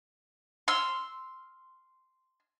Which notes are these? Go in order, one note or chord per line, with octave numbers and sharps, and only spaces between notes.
C6 E6 F6